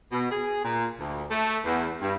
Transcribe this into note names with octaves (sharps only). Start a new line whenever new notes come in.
B2
G#4
A#2
D2
A3
E2
G2